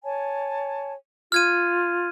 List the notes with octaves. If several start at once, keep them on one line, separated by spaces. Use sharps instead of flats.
C#5 G#5 A5
F4 F6 G#6 D#7